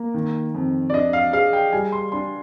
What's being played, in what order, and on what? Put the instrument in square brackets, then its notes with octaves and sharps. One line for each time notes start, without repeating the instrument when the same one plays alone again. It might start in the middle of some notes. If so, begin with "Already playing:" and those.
Already playing: [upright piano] A#3
D#3
F2
[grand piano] D5
[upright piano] D4 [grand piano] D#5
[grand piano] F5
[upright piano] G#4 [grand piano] F5
[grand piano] G5
[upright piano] G3 [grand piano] G#5
[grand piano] C6
[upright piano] D4 [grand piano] C6